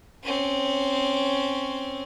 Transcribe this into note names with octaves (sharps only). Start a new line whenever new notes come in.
C4 C#4